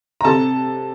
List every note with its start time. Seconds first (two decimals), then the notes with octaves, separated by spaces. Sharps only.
0.21 A#5
0.24 C3 A4 A5